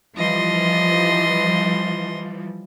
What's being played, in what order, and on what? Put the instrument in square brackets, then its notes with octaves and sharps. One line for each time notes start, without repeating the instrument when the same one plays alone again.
[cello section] E3 F3 G3 [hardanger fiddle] D#5 C6